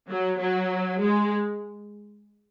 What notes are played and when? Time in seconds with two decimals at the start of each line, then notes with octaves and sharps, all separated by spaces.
0.10 F#3
0.40 F#3
1.01 G#3